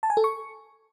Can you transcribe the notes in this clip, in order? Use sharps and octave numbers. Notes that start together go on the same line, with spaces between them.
A5
G#5
A4
C#6